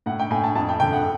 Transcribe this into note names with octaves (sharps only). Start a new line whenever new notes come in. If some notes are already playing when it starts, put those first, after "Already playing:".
A2 F#5
G5
A2 G#5
A5
F2 A5
G5
D3 G5
F#5